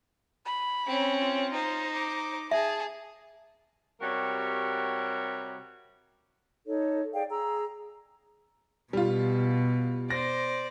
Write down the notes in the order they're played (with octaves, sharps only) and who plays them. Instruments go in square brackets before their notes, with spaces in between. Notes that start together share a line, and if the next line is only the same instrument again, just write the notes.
[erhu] B5
[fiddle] C4 C#4
[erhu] F4
[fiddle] D#4 C5
[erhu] D6
[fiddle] G#4 [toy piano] E5 [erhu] A5
[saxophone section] C3 G3 F#4 A#4 C#5
[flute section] D#4 A4 C#5
G#4 D5 F5 G5
G#4 A#5 E6
[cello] B2 [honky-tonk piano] G3 F4
[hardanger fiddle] C5 D5 [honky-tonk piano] A#6